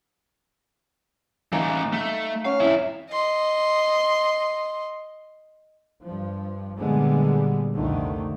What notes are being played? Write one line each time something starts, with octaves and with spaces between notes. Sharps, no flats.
E3 A3 D#4 D5 F5
A3
C#4 F5
F2 E4
D#5 C6
G2 F3
A#2 D3 G3 G#3 B3
C2 F2 D3 D#3 A3